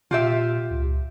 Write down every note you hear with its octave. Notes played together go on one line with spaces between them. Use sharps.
A#2 F4 G4 E5
C#2